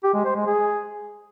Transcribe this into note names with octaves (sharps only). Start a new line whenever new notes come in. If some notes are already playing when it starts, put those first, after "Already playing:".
G4
G#3
C5
G#3
G#4